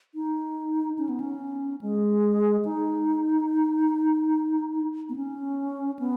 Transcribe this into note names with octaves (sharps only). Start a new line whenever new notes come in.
D#4
C#4
B3
C#4
G#3
D#4
B3
C#4
B3